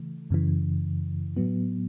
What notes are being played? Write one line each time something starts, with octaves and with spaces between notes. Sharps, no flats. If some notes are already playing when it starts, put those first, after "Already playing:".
Already playing: C#3 E3 A3
F#2 C#3 E3
A2 F#3 B3